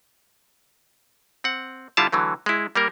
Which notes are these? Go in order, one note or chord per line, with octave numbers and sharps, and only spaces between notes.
C4 F#5
D3 G3 E4 F4 F5 A5
D3 E3 F#3 A3
G#3 E4
G3 A#3 A#4